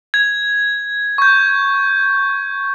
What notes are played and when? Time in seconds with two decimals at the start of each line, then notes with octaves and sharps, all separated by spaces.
0.14 G#6
1.18 C#6 G6